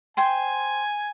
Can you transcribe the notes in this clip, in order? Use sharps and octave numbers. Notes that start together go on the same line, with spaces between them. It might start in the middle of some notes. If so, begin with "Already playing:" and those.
C5 G5 G#5 C6